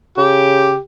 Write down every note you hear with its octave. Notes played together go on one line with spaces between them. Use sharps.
C#3 G4